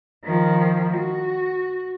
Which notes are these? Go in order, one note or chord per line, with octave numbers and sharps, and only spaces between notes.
D#3 F3
F#4